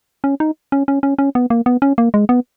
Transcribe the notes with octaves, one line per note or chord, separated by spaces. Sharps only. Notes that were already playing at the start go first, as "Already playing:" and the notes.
C#4
D#4
C#4
C#4
C#4
C#4
B3
A#3
B3
C#4
A#3
G#3
B3